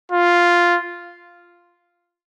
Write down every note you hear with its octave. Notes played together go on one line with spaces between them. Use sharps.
F4